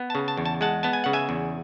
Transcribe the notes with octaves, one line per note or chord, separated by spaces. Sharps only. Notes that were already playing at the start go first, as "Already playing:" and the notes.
Already playing: B3
A5
C#3
A5
E2
A5
G#3 F#5 A5
B3 A5
G#5
C#3 F#5
E5 G#5
E2